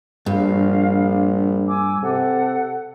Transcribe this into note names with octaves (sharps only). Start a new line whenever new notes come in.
A#1 G2 F5
G#5 D6 E6
C3 A4 F#5